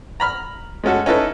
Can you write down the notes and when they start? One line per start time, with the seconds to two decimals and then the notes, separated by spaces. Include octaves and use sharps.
0.20 A#5 B5 F6
0.84 G#3 A3 C#4 F#4 A4
1.06 C#4 D#4 E4 A4 B4